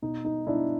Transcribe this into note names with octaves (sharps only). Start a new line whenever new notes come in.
B2 D#4
D#4
B2 D4 E4